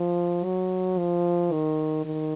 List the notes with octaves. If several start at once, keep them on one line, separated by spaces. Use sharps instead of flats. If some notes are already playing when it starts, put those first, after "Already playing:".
Already playing: F3
F#3
F3
D#3
D#3